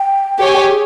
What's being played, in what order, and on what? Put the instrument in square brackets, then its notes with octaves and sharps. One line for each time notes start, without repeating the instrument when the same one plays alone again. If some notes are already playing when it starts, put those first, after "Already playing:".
Already playing: [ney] G5
[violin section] G4 C#5 G#5
[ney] G#4